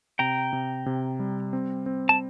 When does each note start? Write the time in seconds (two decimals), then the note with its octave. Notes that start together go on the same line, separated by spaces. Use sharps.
0.19 C3 G5 A#5
0.53 C3
0.86 C3
1.20 G3
1.53 C4
1.86 C4
2.09 A5